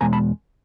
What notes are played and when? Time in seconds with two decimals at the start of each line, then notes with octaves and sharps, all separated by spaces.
0.01 E2 B2 G#3 G#5 A#5
0.13 A5 B5